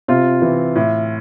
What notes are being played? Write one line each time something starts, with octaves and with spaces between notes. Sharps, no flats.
C3 F4
E3
A2